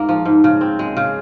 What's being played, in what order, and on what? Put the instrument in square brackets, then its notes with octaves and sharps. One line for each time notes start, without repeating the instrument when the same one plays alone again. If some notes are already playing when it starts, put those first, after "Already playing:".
Already playing: [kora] G#2 A#3
F3
G#2
C#3
C4
G#3
C#3